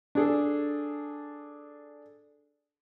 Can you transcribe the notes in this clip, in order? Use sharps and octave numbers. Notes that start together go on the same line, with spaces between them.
D4 G#4 A4